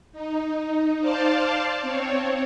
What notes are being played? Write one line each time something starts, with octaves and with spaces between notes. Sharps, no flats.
D#4
C5 D5 F5 A5
C4 C#5